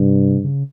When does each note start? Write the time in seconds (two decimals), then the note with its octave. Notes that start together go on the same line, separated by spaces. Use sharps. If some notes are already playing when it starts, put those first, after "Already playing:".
Already playing: G2 C3
0.44 C#3